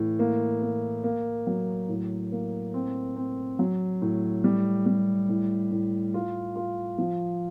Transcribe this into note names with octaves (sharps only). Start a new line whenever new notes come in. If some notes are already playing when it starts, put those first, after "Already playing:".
Already playing: A2 E3
A#3
A#3
A#3
F#3
A2
A#3
C4
C4
F#3
A2
G3
G3
A2
A2
F4
F4
F3